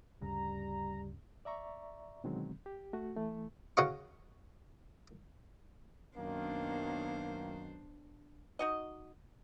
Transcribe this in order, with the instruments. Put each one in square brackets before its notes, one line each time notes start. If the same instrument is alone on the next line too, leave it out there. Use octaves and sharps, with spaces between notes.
[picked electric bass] D2 G2 C#3 [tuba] G3 [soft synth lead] A#5
[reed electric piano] D5 E5 A#5 C#6
B2 D3 D#3 F#3 G#3 C4
G4
A3 F#4
E3 A3
[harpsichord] C#3 C#4 F#4 D#5 F5 C#6
[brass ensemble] F#2 D#3 [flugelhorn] A#3 [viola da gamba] B3 D4 C5
[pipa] D#4 F#4 D#5